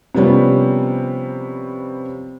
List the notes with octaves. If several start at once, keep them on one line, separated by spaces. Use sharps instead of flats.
C3 F3 G3 B3 C#4